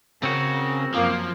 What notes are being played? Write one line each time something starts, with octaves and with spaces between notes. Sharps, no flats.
C#3 C4 F#4 A#4
F#2 F3 A#3